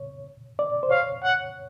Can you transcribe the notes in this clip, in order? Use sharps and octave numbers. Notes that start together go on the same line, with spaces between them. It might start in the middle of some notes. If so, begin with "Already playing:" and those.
Already playing: C#5
D5
C5
C#5 F5
F#5